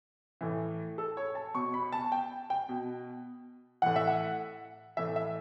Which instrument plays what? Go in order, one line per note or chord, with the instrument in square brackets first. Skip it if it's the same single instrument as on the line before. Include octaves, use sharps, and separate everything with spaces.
[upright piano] A2 E3
A4
C#5
A5
B2 C#6
B5
A5
G5
G5
B2
A2 E3 F#5
E5
F#5
A2 E3 E5
E5